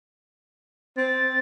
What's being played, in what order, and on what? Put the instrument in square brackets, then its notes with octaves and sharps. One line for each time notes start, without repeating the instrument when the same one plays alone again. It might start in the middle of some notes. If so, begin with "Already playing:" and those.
[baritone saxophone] C4 [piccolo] A6